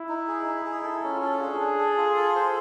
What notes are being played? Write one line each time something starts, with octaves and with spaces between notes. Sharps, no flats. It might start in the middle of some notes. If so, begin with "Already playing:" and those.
Already playing: E4
D#4
G#4
D#4
G#4
E4 A4
C#4
F4
A4
D4 G#4
D4
A4
F4
A4
C5